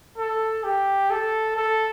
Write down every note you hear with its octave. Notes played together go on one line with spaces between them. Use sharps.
A4
G4
A4
A4